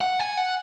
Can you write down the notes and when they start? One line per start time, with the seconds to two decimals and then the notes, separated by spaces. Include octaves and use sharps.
0.01 F#5
0.20 G#5
0.37 F#5